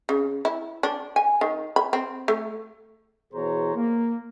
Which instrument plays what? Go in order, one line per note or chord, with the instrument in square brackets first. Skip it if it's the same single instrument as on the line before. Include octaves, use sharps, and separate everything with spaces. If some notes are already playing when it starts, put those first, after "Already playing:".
[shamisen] C#3
E4
D4
G#5
D#3
B5
C4
A3
[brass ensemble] B2 E3 G#4 C5 C#5 A#5
A#3